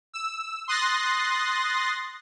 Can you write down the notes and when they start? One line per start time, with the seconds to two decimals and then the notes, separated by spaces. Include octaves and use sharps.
0.14 E6
0.68 C6 D#6 F#6 A6 A#6 C7